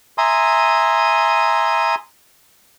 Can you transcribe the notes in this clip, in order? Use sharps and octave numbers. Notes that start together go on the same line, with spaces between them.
E5 G#5 A#5 C6 D#6